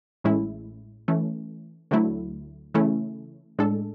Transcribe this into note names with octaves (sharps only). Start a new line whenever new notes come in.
A1 A2 G#3 C#4 E4
E3 A3 C#4
D2 D3 F#3 A3 E4
C#3 E3 A3 C#4 E4
A2 G#3 D4 A4